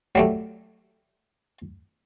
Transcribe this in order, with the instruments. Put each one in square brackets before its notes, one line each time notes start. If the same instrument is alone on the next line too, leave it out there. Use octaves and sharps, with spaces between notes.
[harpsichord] F#3 G3 A3